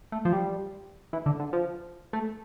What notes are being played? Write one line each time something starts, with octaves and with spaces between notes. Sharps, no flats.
A3
F3
G3
E3
D3
D3
F3
A3